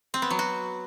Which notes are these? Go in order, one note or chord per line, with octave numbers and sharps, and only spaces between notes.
C4
B3
F#3
F#4